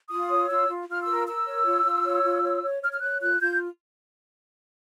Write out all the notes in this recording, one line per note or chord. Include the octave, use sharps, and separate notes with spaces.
F4 D#6
C#5
F4 E6
F4
F4 F6
E6
A#4
A#4 E6
C#5
F4
F4
C#5
F4
C#5
C#5
C#5 F6
F6
C#5 F#6
F4 F#6
F4 G6